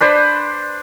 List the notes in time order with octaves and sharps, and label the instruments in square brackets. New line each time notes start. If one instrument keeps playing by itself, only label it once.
[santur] D4 B4 C5